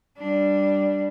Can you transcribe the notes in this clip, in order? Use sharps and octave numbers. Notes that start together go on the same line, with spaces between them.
G3 D4